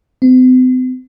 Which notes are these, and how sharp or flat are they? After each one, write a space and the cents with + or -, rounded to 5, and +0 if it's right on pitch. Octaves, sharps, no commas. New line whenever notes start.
C4 -45